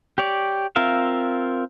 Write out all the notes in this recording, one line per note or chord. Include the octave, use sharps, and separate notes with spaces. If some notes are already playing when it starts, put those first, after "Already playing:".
G4 C#5 D5
C4 F4 A#4 E5 F5